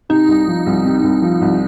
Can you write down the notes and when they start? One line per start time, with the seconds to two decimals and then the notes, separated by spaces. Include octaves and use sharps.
0.09 C3 D#4
0.28 C2
0.48 F3
0.66 C2
0.85 C3
1.04 C2
1.22 F3
1.41 C2